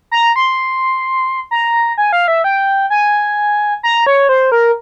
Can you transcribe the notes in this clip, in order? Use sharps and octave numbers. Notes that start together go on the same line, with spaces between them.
A#5
C6
A#5
G#5
F5
E5
G5
G#5
A#5
C#5
C5
A#4